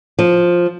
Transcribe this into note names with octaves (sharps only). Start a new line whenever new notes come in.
F3